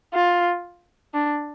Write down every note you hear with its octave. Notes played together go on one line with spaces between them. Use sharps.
F4
D4